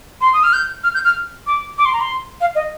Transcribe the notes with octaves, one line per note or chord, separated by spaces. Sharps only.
C6
D#6
F6
G6
F6
G6
F6
D6
D6
C6
A#5
C6
F5
D#5